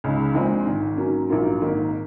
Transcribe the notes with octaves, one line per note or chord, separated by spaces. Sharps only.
C#2 C#3 G#3 D#4
A#1 A#2 G#3 C4
G#1 G#2 D#3
G#2 F#3 A#3 C#4
A#1 G#2 F#3 A#3 F4
G#1 G#2 D#3 A#3 D#4